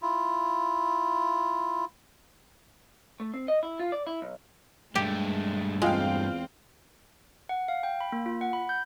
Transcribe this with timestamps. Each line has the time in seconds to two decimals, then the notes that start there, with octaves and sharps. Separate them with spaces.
0.02 E4 F4
3.20 A3
3.34 C4
3.48 D#5
3.63 E4
3.79 F4
3.92 D5
4.07 E4
4.22 B1
4.95 G2 G#3 A3 G4
5.82 E2 G#3 C4 F4 F5 G5
7.49 F#5
7.68 F5
7.83 G5
8.01 B5
8.12 A#3
8.26 F4
8.41 F#5
8.53 B5
8.69 G6